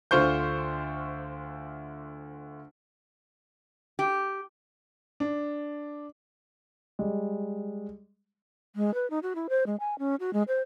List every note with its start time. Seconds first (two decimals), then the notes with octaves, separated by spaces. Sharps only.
0.11 D2 D3 F4 C5 C#6 G6
3.99 G4
5.20 D4
6.99 G3 G#3
8.76 G#3
8.94 B4
9.10 D#4
9.23 F#4
9.35 E4
9.49 C5
9.66 G#3
9.80 G#5
9.99 C#4
10.20 F#4
10.33 G#3
10.48 C5